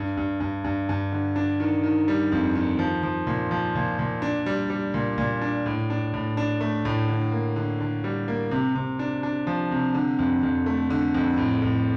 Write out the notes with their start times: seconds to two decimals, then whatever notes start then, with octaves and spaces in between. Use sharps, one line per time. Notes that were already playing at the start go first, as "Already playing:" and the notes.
Already playing: G2
0.17 G2
0.40 G2
0.64 G2
0.89 G2
1.12 D3
1.36 D4
1.60 D#3
1.83 D#3
2.08 G3
2.32 F2
2.55 D#3
2.79 F3
3.03 F3
3.27 A#2
3.51 F3
3.75 A#2
3.99 A#2
4.22 D4
4.46 G3
4.70 G3
4.94 A#2
5.18 A#2
5.41 D4
5.66 A2
5.90 D4
6.14 A2
6.37 D4
6.61 A3
6.85 A2
7.08 D3
7.32 A#3
7.56 D3
7.80 D3
8.04 G3
8.28 A#3
8.51 C3
8.76 C3
8.99 D4
9.23 D4
9.47 F3
9.71 C3
9.94 D3
10.19 F2
10.43 F2
10.66 A3
10.90 D3
11.14 F2
11.38 A2
11.62 A2